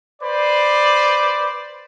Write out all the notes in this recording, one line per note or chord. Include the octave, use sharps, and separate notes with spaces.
B4 C5 D5